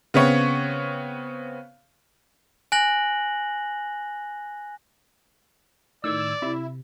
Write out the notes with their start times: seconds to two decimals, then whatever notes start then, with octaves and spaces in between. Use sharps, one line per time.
0.14 C#3 B3 C4 C#5
2.72 G#5 F#6 A#6 F#7
6.04 A2 D#3 D5 E6 G#6
6.42 C3 E4